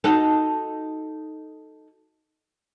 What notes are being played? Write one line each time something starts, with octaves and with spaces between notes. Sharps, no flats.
D#4 F#4 A4